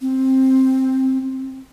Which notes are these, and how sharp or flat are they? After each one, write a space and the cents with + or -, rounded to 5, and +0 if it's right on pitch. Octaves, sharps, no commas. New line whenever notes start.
C4 +10